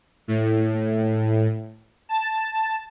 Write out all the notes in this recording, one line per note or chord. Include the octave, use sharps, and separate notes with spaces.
A2
A5